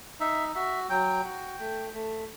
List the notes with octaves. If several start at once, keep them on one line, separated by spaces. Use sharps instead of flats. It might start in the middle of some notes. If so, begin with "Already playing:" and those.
D#4 E5
F#4 E5
F#3 G5
F#4
A3
A3